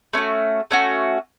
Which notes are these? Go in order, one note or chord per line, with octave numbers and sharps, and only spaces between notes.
A3 C#4 F#4
A3 C#4 F#4